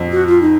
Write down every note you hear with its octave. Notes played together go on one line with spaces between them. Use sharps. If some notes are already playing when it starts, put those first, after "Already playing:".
Already playing: F2
F#4
F4
D#4